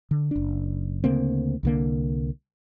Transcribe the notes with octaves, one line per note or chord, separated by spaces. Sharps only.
D3
F#1 D4
D2 C#3 A#3 C4
C2 D3 A#3